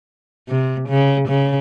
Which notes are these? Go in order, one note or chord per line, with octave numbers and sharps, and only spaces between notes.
C3
C#3
C#3